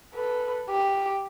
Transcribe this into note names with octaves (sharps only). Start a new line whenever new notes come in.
A4 B4
G4